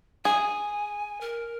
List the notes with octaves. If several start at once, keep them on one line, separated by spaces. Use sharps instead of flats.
G#4 G#5
A#4